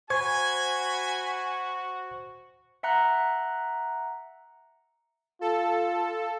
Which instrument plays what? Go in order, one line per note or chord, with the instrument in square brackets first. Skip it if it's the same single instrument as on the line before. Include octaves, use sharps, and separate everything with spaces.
[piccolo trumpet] F#4 [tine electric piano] C5 C#6 G#6 [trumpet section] G#5 B5
[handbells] E5 F#5 A#5 F#6
[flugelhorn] F4 [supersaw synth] A4